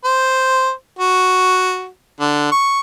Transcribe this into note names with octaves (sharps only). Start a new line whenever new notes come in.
C5
F#4
D3
C#6